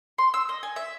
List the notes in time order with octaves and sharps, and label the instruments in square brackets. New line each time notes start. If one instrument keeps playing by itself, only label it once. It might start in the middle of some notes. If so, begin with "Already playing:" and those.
[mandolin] C6
E6
D#5
G#5
E5